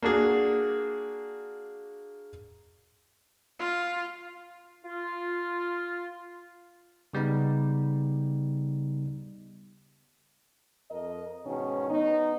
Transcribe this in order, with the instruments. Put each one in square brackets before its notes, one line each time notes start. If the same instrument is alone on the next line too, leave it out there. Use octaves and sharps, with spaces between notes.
[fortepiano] A#3 D4 F#4 G#4
[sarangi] F4
[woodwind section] F4
[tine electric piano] C#3 G3 B3 D#4
[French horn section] F2 A#4 D#5
G#2 B2 D#3 C#4
B3 D#4